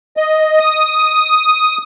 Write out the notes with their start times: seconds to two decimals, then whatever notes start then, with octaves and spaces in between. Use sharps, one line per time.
0.17 D#5
0.60 D#6